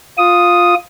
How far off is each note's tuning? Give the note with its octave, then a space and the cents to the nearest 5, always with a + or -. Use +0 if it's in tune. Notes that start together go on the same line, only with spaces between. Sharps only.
F4 +10 D#6 +0